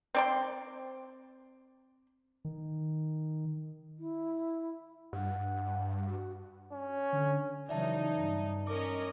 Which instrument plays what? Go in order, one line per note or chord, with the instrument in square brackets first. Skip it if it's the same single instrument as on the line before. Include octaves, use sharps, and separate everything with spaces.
[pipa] C4 D5 C6
[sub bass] D#3
[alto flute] E4
[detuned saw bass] G2 [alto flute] F#5
[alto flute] F#4
[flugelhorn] C#4
[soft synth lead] D3
[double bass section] C#3 E3 F#3 [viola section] D#4 [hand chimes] D5 E5 A5
[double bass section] G2
[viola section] C#4 A#4 D#5 [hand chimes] D6